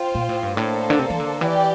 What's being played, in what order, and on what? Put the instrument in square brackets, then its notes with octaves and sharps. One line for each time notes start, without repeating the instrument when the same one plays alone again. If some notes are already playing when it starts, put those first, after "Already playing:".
Already playing: [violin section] F4 C5 G5
[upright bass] A#2
A2
G2
[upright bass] A2 [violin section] A#3 D4 A4 C5
[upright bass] D3
C3
E3
D3
[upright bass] E3 [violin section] G4 D5 G5